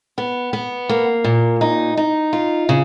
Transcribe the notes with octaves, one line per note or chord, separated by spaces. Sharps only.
B3
B3
A#3
A#2
D#4
D#4
F4
C#3